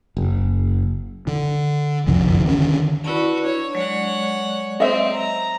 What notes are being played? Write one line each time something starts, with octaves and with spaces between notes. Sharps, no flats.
F#1
D3
F#1 C2 F2 D3
D3 D#3 G3 C#4
E4 F#4 B4 D5 A5
D4 C#5
F#3 G#3 C#5 D5 F#5
C4 C5 D#5 E5
A#5